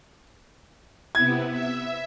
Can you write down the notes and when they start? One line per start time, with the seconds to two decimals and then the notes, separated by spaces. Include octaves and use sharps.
1.15 C3 B3 E4 G#6
1.51 E5